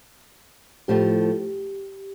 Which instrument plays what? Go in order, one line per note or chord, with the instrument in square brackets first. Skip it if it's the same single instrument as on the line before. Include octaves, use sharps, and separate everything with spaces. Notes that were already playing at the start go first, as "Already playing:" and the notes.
[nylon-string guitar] A2 F3 A3 [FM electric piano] G4